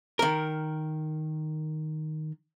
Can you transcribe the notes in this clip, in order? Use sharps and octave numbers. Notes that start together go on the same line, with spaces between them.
D#3 A#4